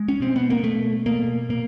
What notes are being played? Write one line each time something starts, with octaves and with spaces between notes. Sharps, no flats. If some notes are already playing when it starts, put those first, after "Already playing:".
Already playing: G#3
C#4
B2 C4
B3
A#3
B2 A3
B2 A#3
A#2 A#3